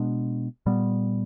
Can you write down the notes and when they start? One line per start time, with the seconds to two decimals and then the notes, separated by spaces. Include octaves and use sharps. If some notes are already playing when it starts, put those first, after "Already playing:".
Already playing: B2 G#3 B3 D4
0.66 A#2 G3 B3